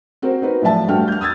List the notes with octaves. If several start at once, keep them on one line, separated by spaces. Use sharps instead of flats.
C4 F#4 A#4 C5
C4 D#4 F#4 B4
A2 F3 F#3 D5 E5 A5
G2 A3 F#4 G5 F6
F6 G6
D#6 E6 G#6 A6